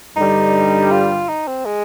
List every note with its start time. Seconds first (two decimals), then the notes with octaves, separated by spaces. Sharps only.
0.16 G2 D3 G3 D#4
0.91 F4
1.29 D#4
1.47 C4
1.65 G#3